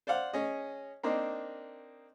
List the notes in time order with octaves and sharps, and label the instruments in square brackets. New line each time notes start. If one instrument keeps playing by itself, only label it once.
[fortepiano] C5 D5 F5 F#5
C#4 G#4 D#5
A#3 C4 D4 D#4 D#5